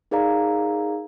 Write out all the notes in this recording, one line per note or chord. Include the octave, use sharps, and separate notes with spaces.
D#4 G#4 A#4 D5 F5 A#5